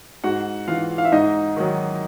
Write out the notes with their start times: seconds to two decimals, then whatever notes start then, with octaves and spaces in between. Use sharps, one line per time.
0.24 G#2 F#4 F#5
0.68 E3 F4 F5
0.98 F5
1.05 E5
1.12 G#2 D#4 D#5
1.57 D#3 F#3